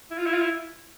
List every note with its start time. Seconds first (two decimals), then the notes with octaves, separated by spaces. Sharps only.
0.11 E4
0.18 F4
0.26 E4
0.34 F4
0.41 E4